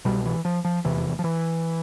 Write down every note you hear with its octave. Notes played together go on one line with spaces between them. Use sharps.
C2 B2 G3
E3
F3
F3
F1 E2 C3 E3
F3
E3